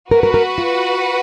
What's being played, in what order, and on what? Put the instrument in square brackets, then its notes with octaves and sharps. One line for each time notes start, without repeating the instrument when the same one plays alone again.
[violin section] F#4 B4 F#5 [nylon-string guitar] A#4
[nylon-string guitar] A#4
A#4
F4